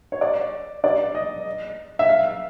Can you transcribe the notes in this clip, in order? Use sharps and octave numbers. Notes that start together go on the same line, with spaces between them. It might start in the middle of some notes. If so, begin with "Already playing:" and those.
C#5
D5
D5
D#5
E5
F5